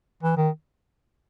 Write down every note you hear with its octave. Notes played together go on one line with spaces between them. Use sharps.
E3
D#3